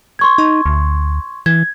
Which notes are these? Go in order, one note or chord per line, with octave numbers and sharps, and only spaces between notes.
C6 C#6 G#6
D#4
D2
E3 G#6